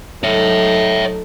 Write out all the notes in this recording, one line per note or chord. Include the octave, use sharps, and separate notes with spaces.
F#3 A3 D#4 C#5 E5